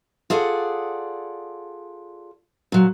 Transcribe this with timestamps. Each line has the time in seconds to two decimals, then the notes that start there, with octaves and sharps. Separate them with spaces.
0.30 F4 G#4 A4 D5 F#5
2.72 A#2 F#3